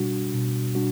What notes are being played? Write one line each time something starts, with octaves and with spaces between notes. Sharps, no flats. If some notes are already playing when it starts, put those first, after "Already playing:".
Already playing: B2 G3 D4 F#4
B2
G3 D4 F#4